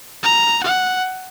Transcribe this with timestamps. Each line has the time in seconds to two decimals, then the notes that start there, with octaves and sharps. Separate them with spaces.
0.23 A#5
0.63 F#5